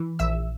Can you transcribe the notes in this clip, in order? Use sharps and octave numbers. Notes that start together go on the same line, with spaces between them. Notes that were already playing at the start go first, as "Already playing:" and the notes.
Already playing: E3
A#1 E5 E6